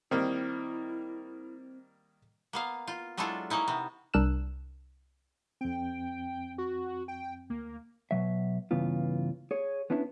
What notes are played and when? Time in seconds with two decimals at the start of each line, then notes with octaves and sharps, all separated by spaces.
0.11 D#3 G3 A#3 C4 E4
2.53 A#3 B3 F5
2.87 F4
3.17 F#3 G#3 D4 E4 F4 A4
3.50 A#3 C#4 D#4 E4
3.68 C3 B3
4.14 C2 D4 A#4 E6 F#6 E7
5.61 F2 C4 G5
6.58 F#4
7.08 G5
7.50 D2 A#3
8.11 B2 F#3 E5
8.71 G2 C#3 E3 B3 F4
9.51 G#4 C#5
9.90 B3 C#4 D4 E4 G#4 B4